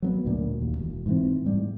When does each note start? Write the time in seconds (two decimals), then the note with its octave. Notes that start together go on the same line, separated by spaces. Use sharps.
0.02 F#3 A#3 B3
0.25 D2 A#2
0.61 D#2
0.79 E1
1.06 G#2 E3 C4
1.46 G#2 G3